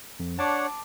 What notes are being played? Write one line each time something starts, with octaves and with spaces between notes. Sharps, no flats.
F2
D4 C#5 F#5 A5 D6